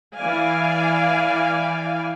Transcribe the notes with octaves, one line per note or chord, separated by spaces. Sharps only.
E3 D5 F5 G#5